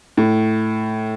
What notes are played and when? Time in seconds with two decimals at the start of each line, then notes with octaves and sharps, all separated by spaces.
0.17 A2